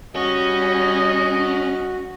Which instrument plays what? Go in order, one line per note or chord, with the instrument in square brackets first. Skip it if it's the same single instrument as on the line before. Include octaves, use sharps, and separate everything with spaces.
[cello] G3 [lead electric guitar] C#4 [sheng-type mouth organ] F#4 [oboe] D#5